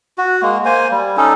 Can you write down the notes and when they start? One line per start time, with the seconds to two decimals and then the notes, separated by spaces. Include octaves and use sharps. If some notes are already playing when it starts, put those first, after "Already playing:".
0.18 F#4
0.42 G#3 A#3
0.65 A#3 C5 G#5
0.91 G3
1.17 C#4 D#4 A4